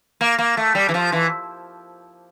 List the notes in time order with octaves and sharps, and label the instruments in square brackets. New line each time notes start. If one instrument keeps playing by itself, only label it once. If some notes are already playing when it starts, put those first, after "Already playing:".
[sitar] A#3
A#3
A3
G3
E3
F3
E3